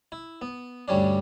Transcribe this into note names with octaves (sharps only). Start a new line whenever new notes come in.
E4
B3
D2 G2 G3 C#4 D4